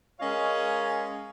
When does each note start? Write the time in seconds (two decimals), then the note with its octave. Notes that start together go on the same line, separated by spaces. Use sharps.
0.20 G#3 C#4 A#4 C#5 D#5 F5